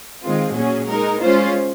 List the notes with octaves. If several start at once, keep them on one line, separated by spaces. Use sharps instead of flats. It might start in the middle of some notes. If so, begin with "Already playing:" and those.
D#3 G#3 C4 F4
A#2 F#3 C#4 G#4
G#3 D#4 A#4
G#3 C#4 F4 C5